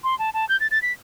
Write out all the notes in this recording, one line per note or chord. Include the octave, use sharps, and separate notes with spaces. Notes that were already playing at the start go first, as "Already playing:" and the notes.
C6
A5
A5
G6
A6
A6
B6